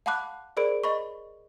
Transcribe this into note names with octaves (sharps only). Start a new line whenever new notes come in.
F5 F#5 A5 B5 D6 F#6
G#4 A#4 C5 D5 B5 D7
D#5 B5 C#6